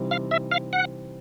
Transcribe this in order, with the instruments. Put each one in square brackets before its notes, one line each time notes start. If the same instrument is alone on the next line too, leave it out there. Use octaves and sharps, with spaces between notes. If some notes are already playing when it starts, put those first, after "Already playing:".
Already playing: [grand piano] C3 E3 G3 C4 D#4
[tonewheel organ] F5
E5
F5
F#5